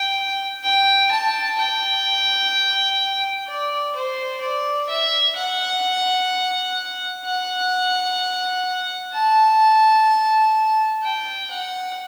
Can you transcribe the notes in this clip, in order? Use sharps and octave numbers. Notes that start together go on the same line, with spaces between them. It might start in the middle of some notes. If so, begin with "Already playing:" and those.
Already playing: G5
G5
A5
G5
D5
C5
D5
E5
F#5
F#5
A5
G5
F#5